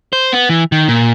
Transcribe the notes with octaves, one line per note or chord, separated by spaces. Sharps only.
C5
B3
E3
D#3
A#2